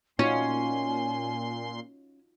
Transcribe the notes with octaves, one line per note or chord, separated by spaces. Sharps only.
A#2 C#4 D#4 F4 F#4 G#5 C6